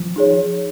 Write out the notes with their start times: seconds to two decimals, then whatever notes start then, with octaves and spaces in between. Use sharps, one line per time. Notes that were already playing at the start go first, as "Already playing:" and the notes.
Already playing: F3
0.16 D#4 G#4 C#5